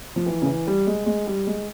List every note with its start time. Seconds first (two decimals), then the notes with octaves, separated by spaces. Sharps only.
0.16 F3
0.26 E3
0.42 C#3
0.46 E3
0.67 G3
0.86 G#3
1.06 G#3
1.27 G3
1.47 G#3